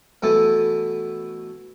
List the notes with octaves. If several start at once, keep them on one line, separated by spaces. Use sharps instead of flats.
B2 E3 A3 B3 E4 A4